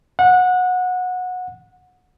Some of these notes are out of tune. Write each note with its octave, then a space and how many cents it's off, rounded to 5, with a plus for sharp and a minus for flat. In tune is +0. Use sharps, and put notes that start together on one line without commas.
F#5 -20